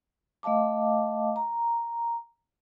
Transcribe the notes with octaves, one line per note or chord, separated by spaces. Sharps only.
A3 D#5 F5 A5 D6
A#5